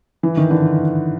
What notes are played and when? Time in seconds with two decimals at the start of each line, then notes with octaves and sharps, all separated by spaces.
0.23 E3
0.37 D#3
0.51 D3 E3